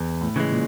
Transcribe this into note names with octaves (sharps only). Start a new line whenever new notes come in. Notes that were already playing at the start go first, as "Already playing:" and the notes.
Already playing: E2
A2
C#3 E3 G#3
A#2